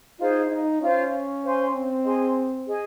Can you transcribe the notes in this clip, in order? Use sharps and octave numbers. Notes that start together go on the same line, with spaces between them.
D#4 F4 G#4 C5
D#4
C#4 F4 C5 F5
C5 F5 G#5 C6
C4
G#4 D#5 G#5 C6
G#4 D#5 G#5